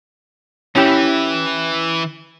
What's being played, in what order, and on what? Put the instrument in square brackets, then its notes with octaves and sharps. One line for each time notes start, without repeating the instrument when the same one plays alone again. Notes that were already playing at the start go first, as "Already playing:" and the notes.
[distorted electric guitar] E3 [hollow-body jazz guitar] C#4 E4 G4